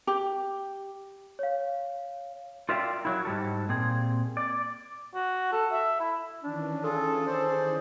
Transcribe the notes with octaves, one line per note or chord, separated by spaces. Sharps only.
G4
C#5 F5
F4 A#4 D5 E5 F5 G5
F#3 E4
G#2 G3 A4
A#2 C4 G#4
D5
F#4
A4
E5
E4
D#3 E3 C#4 D4
F4 G#4 A4
G#4 C5 D5